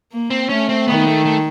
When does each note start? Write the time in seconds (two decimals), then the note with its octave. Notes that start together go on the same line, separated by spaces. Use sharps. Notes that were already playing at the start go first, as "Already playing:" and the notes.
0.12 A#3
0.30 C4
0.49 A3 C#4
0.69 C4
0.88 D#3 B3
1.07 A3
1.25 A3